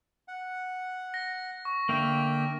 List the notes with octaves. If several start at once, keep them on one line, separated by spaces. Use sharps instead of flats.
F#5
A#6
C#6
D3 A#3 E5 G5